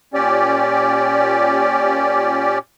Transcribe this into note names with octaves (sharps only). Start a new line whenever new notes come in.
A#2 C#4 G4 D5